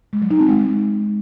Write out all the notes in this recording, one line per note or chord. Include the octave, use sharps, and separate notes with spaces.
G#3
F#3
D#4
C4
G#3